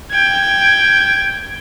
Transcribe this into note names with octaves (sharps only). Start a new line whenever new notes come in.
G5 G#6